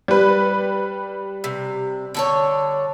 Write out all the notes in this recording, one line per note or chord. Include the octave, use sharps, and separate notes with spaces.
G3 B4
C3
D3 A4 C#5